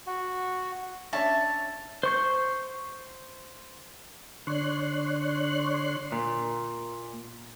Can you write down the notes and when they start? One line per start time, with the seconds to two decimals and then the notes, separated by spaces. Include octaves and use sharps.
0.07 F#4
1.13 C#4 D4 C#5 E5 A5
2.03 C5 C#6 G6
4.47 D3 D4 C#5 C6 F#6
6.12 A#2